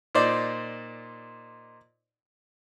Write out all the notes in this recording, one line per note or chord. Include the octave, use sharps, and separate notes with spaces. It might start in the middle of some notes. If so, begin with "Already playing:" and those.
A#2 D#4 C5 D5